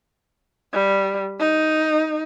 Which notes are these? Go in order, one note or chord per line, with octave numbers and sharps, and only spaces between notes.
G3
D#4